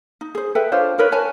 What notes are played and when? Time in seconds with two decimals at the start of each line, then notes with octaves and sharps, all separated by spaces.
0.21 D#4
0.35 G#4 C5
0.55 A4 B4 E5 G5
0.72 D4 F4 C5 C#5
0.98 D#4 A#4 B4 C#5
1.12 B4 C#5 G#5 A5